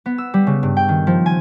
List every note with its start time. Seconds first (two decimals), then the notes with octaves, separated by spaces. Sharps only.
0.06 B3
0.18 E6
0.34 G3
0.47 C#3
0.63 G2
0.77 G5
0.89 D#3
1.07 F3
1.26 G#5